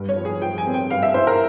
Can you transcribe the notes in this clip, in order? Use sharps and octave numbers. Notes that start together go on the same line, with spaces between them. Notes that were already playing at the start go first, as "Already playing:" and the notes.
Already playing: G2
C#5
F3
G#4
F3 G5
G#5
C4
G5
G2 F5
E5
E4 C5
A#4